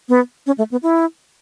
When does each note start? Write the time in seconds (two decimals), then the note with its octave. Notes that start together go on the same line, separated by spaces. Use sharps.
0.09 B3
0.47 C#4
0.58 A3
0.71 B3
0.83 E4